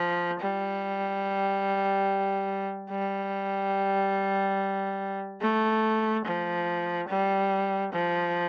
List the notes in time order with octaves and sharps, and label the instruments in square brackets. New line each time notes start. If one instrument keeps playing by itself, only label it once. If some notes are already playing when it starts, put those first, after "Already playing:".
Already playing: [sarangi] F3
G3
G3
A3
F3
G3
F3